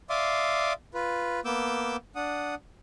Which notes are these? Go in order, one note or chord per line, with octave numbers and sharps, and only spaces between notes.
D5 E5 F5 C6 D6 D#6
F4 B4
A#3 B3 D6 E6 G6
D4 F#5 D#6